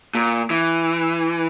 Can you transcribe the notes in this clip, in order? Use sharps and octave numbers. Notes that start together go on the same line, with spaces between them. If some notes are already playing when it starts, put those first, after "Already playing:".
A#2
E3